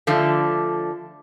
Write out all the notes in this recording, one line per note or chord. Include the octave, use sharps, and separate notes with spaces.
D3 F3 A3